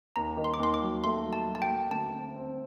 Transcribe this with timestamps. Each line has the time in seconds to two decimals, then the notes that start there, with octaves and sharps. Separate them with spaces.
0.16 D#2 A#5
0.37 D#3
0.44 C6
0.54 D6
0.60 D#2 C6
0.74 D6
0.82 F#3
1.04 A3 C6
1.25 F#3
1.33 A5
1.47 F#3
1.55 A5
1.62 G5
1.70 A3
1.91 D2 A5
2.14 C4
2.36 C4